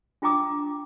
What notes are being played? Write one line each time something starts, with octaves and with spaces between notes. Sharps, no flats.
D4 F4 G5 A#5 D6 D#6